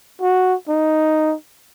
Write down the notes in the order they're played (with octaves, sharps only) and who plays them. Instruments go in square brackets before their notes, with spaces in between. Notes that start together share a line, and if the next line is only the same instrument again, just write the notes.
[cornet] F#4
D#4